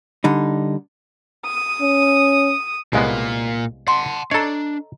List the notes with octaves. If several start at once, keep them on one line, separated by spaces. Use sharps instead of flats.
D3 G3 D#4
D#6
C#4
C2 A#2 G#3 A#3 B3 D#5 F5 G#5
F#5 A5 C6
D4 A4 C#5 D#5 A#5